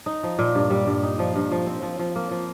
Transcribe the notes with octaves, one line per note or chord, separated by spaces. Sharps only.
D#4
F3
A#2
G2
G3
G2
D#4
F3
G2
F3
C4
F3
F3
A#3
F3